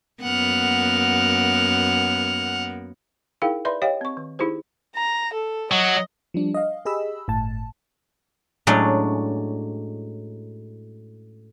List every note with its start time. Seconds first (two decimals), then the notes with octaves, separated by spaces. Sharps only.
0.23 F#2 A#3 B3 F#5 F6
3.42 D#4 E4 G#4 A#4 F5 G5
3.65 B4 D5 E5 B5 C6
3.82 G4 C#5 D#5 F5 G5
4.01 C4 C#6
4.17 D#3
4.39 D#4 E4 G4 G#4 C5
4.95 A#5
5.33 A4
5.72 F#3 D#5
6.34 F3 G3 D4
6.54 D#5 F5
6.85 G4 G#4 D#5 B5 E6
7.28 G1 A2 A5
8.67 A2 F#3 G#3 C#4 D4